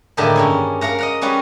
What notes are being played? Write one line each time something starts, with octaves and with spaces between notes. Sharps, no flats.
A2 D3 D#3 A#3 G4 G#4
G2 C#4 G#4
A#4 F5 F#5 A#5
D#5 F#5 A#5
G3 C#4 F#4 G#4 B4